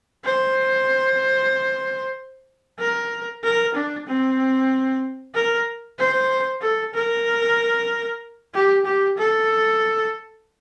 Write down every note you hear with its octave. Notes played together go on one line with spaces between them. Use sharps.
C5
A#4
A#4
D4
C4
A#4
C5
A4
A#4
G4
G4
A4